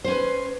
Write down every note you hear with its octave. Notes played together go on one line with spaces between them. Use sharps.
C#4 B4 C5